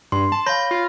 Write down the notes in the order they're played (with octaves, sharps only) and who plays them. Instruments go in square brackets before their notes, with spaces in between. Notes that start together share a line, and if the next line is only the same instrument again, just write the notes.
[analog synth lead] G2 [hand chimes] C6
[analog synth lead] A5
[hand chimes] C#5 F5 [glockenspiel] B5 A#6 [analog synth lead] G6
[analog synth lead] F4